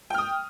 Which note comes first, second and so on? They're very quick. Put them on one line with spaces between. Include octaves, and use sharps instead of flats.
G5 F6 D#6